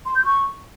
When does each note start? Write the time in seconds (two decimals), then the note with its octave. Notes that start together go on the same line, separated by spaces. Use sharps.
0.05 C6
0.15 G6
0.25 C#6